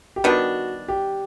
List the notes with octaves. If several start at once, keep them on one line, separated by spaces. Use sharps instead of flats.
G4
D#3 G3 B3 D4 F#4
G4